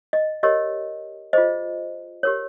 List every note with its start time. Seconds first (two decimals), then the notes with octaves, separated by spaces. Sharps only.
0.13 D#5
0.43 G4 A#4 C#5 D#5
1.33 F4 G#4 C5 D#5
2.23 G4 A#4 C#5